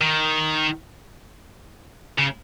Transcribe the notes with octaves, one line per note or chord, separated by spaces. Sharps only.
D#3
C#3